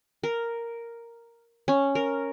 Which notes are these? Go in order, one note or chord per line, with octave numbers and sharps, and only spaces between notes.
A#4
C#4
A#4